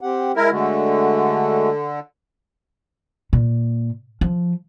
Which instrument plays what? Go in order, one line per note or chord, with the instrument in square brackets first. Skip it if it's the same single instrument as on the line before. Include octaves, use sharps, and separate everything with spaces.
[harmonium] C4 G4 F#5
[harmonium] G#3 [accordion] E4 A#4
[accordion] D3 [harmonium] G#3 A3 F#4
[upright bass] A#2
F3